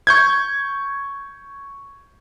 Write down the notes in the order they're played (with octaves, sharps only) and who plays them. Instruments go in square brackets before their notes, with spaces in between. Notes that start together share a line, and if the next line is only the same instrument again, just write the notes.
[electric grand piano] C#6 G6 G#6